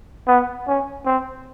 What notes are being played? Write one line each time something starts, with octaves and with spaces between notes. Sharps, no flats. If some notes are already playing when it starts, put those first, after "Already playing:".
B3
C#4
C4